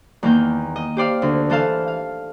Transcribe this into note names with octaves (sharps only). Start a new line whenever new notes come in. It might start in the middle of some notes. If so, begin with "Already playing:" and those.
E2 D#3 A#3 A#4 G6
D#5
G4 C5 D5 F5
D2 D3
E3 A4 C5 F5 A5
F5